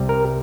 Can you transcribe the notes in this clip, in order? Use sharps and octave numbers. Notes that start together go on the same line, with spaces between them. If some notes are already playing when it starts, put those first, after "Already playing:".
Already playing: C2 C3 G3 C4
A#4